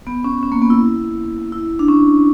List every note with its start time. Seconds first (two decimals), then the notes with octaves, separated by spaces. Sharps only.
0.07 B3
0.24 C#4
0.43 C#4
0.52 A#3
0.62 B3
0.70 E4
1.52 E4
1.79 D4
1.88 C#4